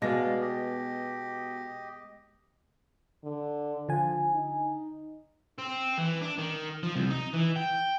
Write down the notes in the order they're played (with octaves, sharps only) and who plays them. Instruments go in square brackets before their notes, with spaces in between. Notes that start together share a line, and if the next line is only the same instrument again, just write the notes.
[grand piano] B2 A#6 [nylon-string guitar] G#3 B3 [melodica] D5 F5
[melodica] G4 D#5
[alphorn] D3
[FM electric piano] D3 G#5 [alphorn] F3
[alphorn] D#4
[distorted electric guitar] C4
E3
D4
D#3
F3
C2
D#4
E3
G5